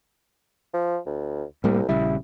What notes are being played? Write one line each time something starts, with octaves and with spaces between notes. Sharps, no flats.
F3
D2
C2 A2 G3 A#3
A#1 C#3 G3 E4